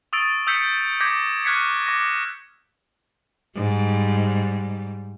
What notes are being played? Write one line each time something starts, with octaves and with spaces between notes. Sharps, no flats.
C#6 D#6 E6 A6 D7
D#6 E6 G6 B6 C#7 D7
D6 G6 G#6 A#6 B6
C#6 F6 F#6 G#6 B6 C#7
D6 A#6
G#2 G3